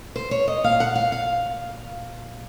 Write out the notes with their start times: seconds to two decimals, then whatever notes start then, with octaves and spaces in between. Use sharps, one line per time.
0.16 C5
0.31 C#5
0.48 D#5
0.63 A#2 F5
0.80 F#5
0.95 F5
1.12 F5